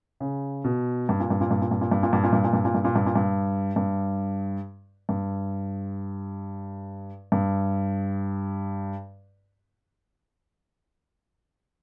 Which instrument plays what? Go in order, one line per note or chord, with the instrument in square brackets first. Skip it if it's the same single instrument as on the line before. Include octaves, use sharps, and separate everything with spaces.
[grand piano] C#3
B2
G2
A#2
G2
A#2
G2
A#2
G2
A#2
G2
A#2
G2
A#2
G2
A#2
G2
A#2
G2
A#2
G2
A#2
G2
G2
G2
G2